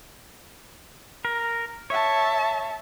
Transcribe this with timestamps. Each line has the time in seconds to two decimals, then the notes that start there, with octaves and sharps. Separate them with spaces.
1.25 A#4
1.90 C#5 E5 A5